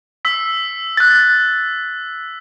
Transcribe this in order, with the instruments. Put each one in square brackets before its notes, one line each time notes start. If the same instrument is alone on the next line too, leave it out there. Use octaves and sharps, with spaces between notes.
[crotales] E6 B6
[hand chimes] F#6 A6